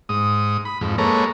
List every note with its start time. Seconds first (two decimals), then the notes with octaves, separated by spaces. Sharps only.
0.09 G#2 D#6
0.65 B5
0.81 F2 G#2
0.98 G#3 A#3 A4 B4 C#5 A#5